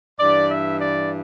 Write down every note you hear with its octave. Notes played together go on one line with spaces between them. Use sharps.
G2 E3 D5
E5
D5